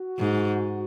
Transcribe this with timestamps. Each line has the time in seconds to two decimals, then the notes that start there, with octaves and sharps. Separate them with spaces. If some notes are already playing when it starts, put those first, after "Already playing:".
Already playing: F#4
0.19 G#2